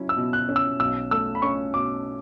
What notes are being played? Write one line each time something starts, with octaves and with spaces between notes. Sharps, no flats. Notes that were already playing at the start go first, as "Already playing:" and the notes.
Already playing: F#3 C#4 E4
E6
B2
F#6
C#4
E6
B1 E6
A3 E6
B5
C#4 C#6
B2 D6